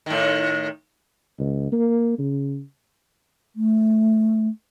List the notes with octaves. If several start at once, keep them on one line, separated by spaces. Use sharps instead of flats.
A2 D#3
C#2
A#3
C#3
A3